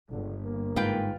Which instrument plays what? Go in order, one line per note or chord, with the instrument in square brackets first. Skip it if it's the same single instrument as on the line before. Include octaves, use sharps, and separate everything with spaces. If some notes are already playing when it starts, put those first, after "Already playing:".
[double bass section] G1 [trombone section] C#2 D3
[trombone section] A#3
[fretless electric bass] G#2 [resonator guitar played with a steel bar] F4 B4 G5